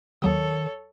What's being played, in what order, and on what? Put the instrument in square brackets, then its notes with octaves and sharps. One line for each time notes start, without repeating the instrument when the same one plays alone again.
[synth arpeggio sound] D#2 F#3 D#6 [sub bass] D#3 [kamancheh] A4 C#5